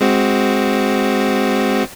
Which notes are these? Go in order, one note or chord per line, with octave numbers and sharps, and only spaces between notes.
G#3 C4 F#4